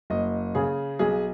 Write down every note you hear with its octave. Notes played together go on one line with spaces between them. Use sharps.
F#1 D#5
C#3 G#4
B1 G#4